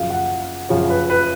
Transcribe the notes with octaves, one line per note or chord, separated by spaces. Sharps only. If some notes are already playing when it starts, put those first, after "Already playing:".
Already playing: F#2 C#3 F3 F5
F#5
F#2 C#3 F3 C#5
B4
B4